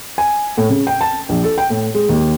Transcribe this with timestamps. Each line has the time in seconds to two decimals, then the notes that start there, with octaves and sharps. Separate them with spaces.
0.18 G#5
0.58 A2
0.70 C#3
0.87 G5
1.01 A5
1.29 A#1
1.44 A4
1.58 G5
1.70 A2
1.94 G#3
2.09 D#2